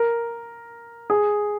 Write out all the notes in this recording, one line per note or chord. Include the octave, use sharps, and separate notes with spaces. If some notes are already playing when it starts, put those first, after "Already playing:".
Already playing: A#4
G#4